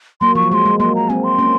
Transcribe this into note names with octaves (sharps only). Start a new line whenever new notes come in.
F#3 A#3 C6
F3 C#6
F#3
G#3 C#6
C6
G#3
F#3 A#3 C6
A#5
G#3 C4 G#5
C6
A#3 C#4